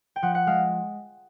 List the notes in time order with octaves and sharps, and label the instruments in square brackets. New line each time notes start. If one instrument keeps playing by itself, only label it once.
[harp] G5
F3 F#5
F#5
G#3 F5